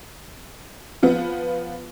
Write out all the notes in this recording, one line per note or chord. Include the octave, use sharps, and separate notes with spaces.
F3 B3